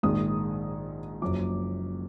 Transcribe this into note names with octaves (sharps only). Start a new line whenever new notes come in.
A#1 G#2 D#3 G#3 D#6
F#1 F#2 F3 D6